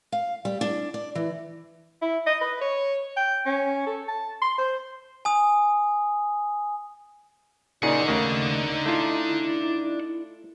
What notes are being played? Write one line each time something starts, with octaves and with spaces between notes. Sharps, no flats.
F5
G3
D4
D5
E3
E4
D#5
B4
C#5
G5
C#4
A4
A5
C6
C5
G#5 D#6
A#2 C#3 D4 D#4 G#4 D5 F#5
D#2 C#3 A3 A#3
A3 E4 F4